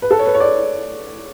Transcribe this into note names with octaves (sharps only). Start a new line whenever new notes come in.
B4
A4
C#5
B4
C#5
D5